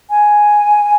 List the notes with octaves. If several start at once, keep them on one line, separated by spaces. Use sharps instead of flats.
G#5